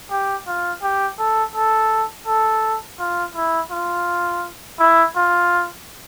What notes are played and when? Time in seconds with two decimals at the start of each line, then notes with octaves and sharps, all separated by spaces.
0.11 G4
0.47 F4
0.83 G4
1.19 A4
1.55 A4
2.27 A4
2.99 F4
3.35 E4
3.71 F4
4.80 E4
5.16 F4